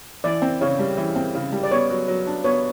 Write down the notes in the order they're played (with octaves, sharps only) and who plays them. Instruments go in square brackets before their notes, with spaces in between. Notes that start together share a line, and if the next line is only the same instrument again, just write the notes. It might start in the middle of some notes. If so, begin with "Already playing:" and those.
[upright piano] E3 [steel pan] D5
[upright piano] C4
[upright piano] C#3 [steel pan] C#5
[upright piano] G3
E3
C4
C#3
G3
[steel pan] D5
[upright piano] B3 [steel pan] C#5
[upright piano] F#3
F#3
D4
[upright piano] B3 [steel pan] C#5